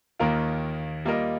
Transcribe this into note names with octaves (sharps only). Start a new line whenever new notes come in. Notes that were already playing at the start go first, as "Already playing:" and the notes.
D#2 D#3 A#3 F4 A#4
G3 A#3 F4 A#4 D#5